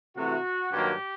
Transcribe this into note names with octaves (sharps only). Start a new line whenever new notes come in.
C3 E3 A3 F#4
G2 D#3 F#3 A#3 G4